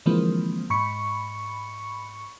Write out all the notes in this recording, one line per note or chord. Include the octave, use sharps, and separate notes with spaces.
D3 E3 F3 G#3 A#3 C4
G#2 B5 C#6 C#7